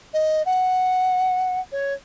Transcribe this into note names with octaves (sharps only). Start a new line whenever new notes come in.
D#5
F#5
C#5